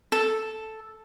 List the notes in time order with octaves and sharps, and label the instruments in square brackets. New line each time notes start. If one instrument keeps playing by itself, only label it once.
[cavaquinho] A4